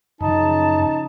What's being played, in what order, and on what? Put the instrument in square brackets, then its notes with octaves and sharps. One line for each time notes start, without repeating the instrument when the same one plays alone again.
[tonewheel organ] F#2 [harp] C#3 F3 [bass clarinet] D#4 [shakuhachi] A5